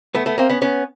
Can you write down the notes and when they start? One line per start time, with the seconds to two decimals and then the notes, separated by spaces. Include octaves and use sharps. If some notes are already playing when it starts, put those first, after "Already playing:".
0.15 A3 B3
0.26 A3 B3
0.38 A#3 C4
0.49 B3 C#4
0.62 B3 C#4